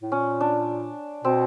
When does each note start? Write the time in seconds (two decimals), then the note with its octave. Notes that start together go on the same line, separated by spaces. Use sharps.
0.02 A2
0.12 A#2 C#4
0.40 D4
1.24 B2 C4